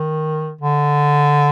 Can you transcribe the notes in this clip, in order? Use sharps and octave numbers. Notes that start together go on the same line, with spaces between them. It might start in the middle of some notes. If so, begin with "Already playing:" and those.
Already playing: D#3
D3